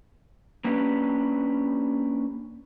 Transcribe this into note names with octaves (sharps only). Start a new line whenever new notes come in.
A#3 C#4 D4 G4 B4